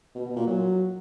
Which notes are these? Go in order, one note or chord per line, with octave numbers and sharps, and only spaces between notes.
B2
B2
A#2
F#3